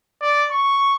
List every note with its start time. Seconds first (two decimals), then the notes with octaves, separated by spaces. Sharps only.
0.21 D5
0.51 C#6